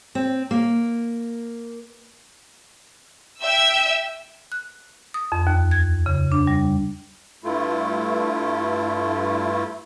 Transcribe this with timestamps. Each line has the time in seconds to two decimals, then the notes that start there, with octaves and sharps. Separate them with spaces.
0.15 C4
0.51 A#3
3.41 E5 G5 E6
4.52 F#6
5.14 D#6
5.32 F2
5.47 D#2
5.71 G#6
6.06 C#3
6.32 D4
6.47 G3
7.44 G2 A3 E4 F4